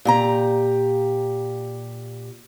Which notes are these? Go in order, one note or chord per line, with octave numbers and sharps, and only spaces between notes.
A#2 G4 A#5